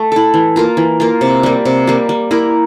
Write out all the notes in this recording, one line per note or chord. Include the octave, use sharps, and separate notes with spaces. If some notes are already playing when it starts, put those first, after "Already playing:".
Already playing: A3
E4 A4
E3
A#3 F4 A#4
E3
A#3 F4 A#4
C3
G3 A#3
C3
G3 A#3
G3
A#3 E4 A#4